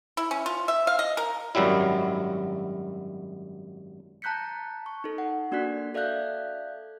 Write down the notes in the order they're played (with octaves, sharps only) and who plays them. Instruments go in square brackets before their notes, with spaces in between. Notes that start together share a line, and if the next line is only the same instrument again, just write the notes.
[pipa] E4
C#4
F4
E5
F5
D#5
A#4
[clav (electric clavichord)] G#1 F#2 F#3 G3 E4
[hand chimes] A5 A#5 F#6 G6 B6 C#7
C#6
D#4 A4
F#5
A#3 D4 F#4 D5 F#6 B6
A4 D5 E5 F5 F#6 G6